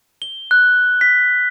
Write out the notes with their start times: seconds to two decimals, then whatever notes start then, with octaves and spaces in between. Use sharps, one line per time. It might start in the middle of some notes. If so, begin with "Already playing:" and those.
0.22 G7
0.51 F#6
1.01 B6